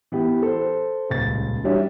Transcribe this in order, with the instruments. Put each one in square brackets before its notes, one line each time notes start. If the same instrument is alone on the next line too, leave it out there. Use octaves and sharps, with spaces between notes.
[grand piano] E3 B3 G4
A4 C5
D#1 C#2 A6
E3 G3 C#4 D4 E4 F#4